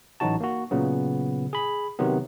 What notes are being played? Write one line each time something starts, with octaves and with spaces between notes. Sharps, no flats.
A1 E3 F#3 D#4 F#4 A5
A#3 F#4
A#2 C#3 F#3 B3
G#4 B5
C3 D#3 F#3 B3